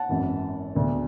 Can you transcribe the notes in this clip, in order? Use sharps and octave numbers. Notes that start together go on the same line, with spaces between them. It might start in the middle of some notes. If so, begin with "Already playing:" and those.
Already playing: F#5 A5
G#1 F#2 E3
E1 D2 D3